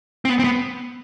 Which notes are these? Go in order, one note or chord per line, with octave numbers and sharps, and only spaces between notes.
C4
B3
C4
B3